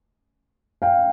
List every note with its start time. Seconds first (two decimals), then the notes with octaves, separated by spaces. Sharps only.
0.82 F5 G5